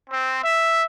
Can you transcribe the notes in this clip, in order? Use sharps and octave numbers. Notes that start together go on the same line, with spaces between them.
C4
E5